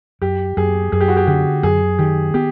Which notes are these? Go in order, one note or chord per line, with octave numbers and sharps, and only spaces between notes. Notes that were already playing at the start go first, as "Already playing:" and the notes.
F#2 G4
F#2 G#4
F#2 G#4
G4
F#4
G4
D3 G4
F#2 G#4
D#3 G4
B3 G4